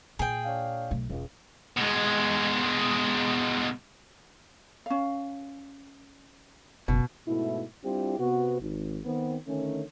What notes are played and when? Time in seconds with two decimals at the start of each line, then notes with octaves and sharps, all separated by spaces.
0.19 A#2 G#4 G5
0.45 D4 C#5 F5
0.91 B1 A3
1.09 E1 C#2
1.77 B2 G#3
4.86 C#4 F5
6.88 F#1 B2
7.27 G#2 B2 A3 E4
7.84 G3 C4 D4 E4 F4 G4
8.19 C3 B3 F#4
8.60 G#1
9.05 D#3 B3 C4
9.48 D3 D#3 A3 C#4